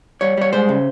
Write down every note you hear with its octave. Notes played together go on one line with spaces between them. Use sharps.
G3 C#5
G3 C#5
G#3 C5
C#3